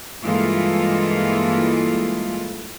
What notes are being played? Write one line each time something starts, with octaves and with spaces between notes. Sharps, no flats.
G2 E3 G#3 A#3 F4 A4